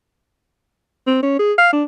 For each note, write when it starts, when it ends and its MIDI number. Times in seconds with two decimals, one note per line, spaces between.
1.07 1.19 60
1.23 1.39 61
1.39 1.53 68
1.58 1.73 77
1.73 1.84 62